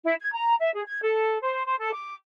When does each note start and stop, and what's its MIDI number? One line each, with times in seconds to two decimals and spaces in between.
0.04 0.15 64
0.20 0.32 92
0.34 0.55 82
0.60 0.72 76
0.74 0.83 68
0.86 1.01 92
1.03 1.39 69
1.41 1.66 72
1.66 1.77 72
1.78 1.92 69
1.92 2.14 86